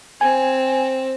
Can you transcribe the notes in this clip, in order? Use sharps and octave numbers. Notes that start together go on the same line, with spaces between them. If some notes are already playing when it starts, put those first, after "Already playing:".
C4 G#5